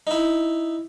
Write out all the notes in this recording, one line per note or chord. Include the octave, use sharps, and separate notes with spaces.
D#4 E4